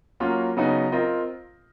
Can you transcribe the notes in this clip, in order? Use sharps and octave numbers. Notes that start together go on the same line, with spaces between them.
F#3 A#3 C#4 F4
C#3 F#3 B3 D#4
C4 F4 A#4 D#5